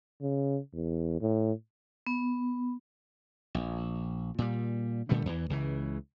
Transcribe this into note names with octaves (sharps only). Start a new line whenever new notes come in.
C#3
E2
A2
B3
A#1
A#2 G3
A#2 D3 G3 A3
E2 E3
C#2 C#3 E3